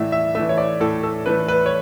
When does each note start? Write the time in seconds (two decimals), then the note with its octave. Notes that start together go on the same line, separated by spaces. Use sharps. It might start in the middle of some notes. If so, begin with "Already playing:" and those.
Already playing: A2 E3 A3 D5 E5
0.12 E5
0.35 E3 A3 E5
0.49 C#5
0.57 D5
0.80 A2 A4
1.03 A4
1.26 E3 A3 B4
1.48 B4
1.66 C#5